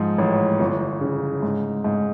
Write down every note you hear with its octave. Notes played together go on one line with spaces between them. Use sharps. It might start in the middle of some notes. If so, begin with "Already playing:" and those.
Already playing: G#2 F3
A1
G1
C#3
G#2
G#2